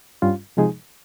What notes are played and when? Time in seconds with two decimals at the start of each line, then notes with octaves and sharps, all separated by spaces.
0.22 G2 G3 C#4 F4
0.57 C3 F3 G#3 D#4 G#4